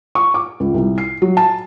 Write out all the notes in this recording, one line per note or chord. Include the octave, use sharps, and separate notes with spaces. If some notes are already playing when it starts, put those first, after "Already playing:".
C#6
D6
C#2
C2
C7
F#3
A5